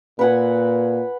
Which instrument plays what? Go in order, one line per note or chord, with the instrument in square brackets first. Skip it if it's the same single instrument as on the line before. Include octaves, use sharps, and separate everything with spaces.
[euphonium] A#2 [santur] B4 F#5 G#5